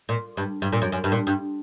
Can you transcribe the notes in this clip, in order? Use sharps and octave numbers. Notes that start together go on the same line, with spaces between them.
A#2
G2
G2
A#2
F#2
F#2
G2
A#2
G2